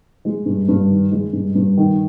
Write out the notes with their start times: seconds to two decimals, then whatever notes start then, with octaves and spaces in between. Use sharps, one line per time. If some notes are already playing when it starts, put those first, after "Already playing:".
0.25 G#3
0.46 G2
0.69 G2
0.90 D#3
1.11 G#3
1.33 G2
1.55 G2
1.77 D#3